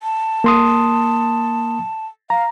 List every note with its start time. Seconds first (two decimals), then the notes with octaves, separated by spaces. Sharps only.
0.03 A5
0.44 A#3 C6 D#6
2.30 F5 A#5